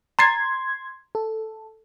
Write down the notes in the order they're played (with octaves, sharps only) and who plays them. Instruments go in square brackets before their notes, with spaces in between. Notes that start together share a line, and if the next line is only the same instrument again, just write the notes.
[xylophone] A#5 A6 C7 [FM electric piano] C6 G#6
[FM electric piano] A4